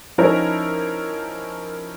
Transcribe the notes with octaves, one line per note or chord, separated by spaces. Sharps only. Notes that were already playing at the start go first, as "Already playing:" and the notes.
F3 C#4 D#4 E4 A#4